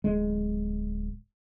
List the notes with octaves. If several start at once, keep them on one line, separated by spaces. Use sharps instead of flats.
D1 G#3